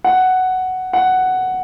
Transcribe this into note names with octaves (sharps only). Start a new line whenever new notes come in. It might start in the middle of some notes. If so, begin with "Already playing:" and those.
F#5
F#5